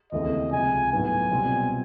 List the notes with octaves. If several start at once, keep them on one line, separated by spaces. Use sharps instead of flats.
D#2 C#3 E3 A3 C4 D#5
C#2 C3 F3 G#5
A2 F#3 B3 D#4 G#5
C2 B2 G3 C4 F4